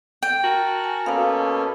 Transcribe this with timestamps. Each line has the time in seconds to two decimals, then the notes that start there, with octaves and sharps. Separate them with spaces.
0.23 G5
0.44 F#4 A#4 A5 A#5
0.84 G#5
1.06 B2 A#3 C#4 A4 F5 A#5